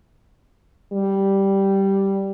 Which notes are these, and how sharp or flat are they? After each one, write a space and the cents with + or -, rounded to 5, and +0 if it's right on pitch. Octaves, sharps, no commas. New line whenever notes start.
G3 -5